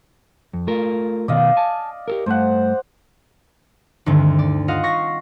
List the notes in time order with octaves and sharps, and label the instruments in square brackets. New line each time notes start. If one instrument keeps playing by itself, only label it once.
[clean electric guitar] F2
A3 F4 A#4
[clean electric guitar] B2 D#3 B3 [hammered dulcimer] D5 D#5 F5
[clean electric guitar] G#5 A5
G4 A4 A#4
[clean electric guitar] G2 A3 [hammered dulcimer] C5 F#5
[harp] D2 G2 D3 D#3 C4
D5
F4 D#5 F5 F#5
C#6 A#6 C7